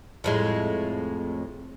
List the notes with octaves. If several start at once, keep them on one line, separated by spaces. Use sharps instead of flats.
F2 A2 G#3